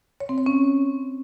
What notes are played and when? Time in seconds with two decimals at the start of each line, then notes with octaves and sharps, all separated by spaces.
0.20 C#5
0.29 C4
0.38 C#5
0.46 C#4